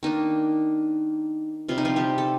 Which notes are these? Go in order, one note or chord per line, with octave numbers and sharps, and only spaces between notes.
D#3 A#3 D4 D#4
C3 G3 C4 F4
D#4
F3 F4
G3 G4
A4